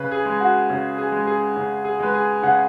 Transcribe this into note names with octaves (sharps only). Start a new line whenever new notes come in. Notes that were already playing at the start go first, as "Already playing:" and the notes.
Already playing: C#3 B4
G#4
G#3
F#4
C#3
G#4
G#3
G#4
C#3
G#4
G#3 B4
G#4
C#3 F#5